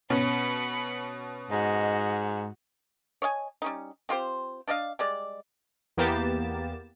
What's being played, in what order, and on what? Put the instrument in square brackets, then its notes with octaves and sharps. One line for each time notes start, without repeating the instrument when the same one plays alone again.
[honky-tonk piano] B2 C#4 [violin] B5 C#7
[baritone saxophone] G#2 [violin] F#4 [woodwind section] D#5
[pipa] C#5 D#5 F5 G#5
G3 C#4 D#4
C4 F4 G4 C5
D4 D5 D#5 F5
G3 G#3 D5
[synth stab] E2 A#3 B3 G4 A6 E7